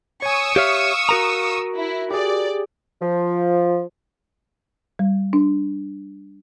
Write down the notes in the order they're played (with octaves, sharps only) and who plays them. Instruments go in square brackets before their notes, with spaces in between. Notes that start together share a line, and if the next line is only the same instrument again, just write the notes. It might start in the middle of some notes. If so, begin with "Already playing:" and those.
[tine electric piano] C#5 G#5 [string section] C#6 D#6 E6
[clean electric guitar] G4 C#5 E5 [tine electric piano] F5 F6
[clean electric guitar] F#4 A#4 A#5
[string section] E4
[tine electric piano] G4 G#4 [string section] D5
[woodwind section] F3
[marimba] G3
D4